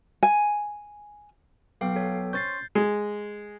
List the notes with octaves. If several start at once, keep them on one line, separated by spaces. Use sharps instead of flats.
G#5
B1 F5 G5
A4 C#5 G5
C#4 C5 G6 A6 C7
G#3